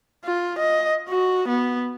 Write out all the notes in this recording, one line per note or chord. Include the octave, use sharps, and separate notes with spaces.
F4
D#5
F#4
B3